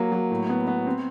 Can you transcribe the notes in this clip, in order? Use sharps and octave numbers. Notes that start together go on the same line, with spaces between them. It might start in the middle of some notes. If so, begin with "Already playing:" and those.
Already playing: F#3 A#3
F#3
A2
B3
B3
C4